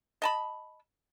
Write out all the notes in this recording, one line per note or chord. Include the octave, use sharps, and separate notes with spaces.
D#5 A5 B5